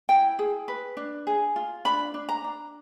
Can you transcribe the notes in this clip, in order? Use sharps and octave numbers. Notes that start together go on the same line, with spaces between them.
E4 G5
G#4
B4
D4
G#4
F4
D4 B5
D4
A#5
D4